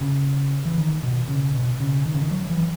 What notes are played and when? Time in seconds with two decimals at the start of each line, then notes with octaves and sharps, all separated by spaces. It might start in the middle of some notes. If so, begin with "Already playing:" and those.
0.01 C#3
0.65 E3
0.78 D#3
1.03 B2
1.29 C#3
1.54 B2
1.80 C#3
2.06 D#3
2.14 C#3
2.22 D#3
2.31 F#3
2.50 E3